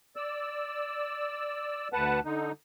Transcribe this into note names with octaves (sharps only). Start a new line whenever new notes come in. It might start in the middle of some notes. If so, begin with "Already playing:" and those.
D5 E6
D2 B4 F#5 A5
D3 D#4